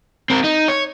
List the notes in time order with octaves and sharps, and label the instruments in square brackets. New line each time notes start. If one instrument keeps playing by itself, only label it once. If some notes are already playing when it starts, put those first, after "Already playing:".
[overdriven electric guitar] C4 A#4
D#4
C#5